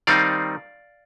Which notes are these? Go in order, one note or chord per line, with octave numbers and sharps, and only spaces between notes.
D#3 G3 C4 D#4 D5 F5